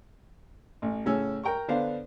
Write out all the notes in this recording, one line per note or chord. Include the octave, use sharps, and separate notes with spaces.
A1
A2 C#3 C#4 E6
A#4 G5 A#5 C#6
D3 B3 D4 C5 F5